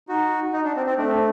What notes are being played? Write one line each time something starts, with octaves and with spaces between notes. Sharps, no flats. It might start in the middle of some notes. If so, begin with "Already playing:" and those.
D#4 F#4
D#4
D4
C4
C4
A3 D4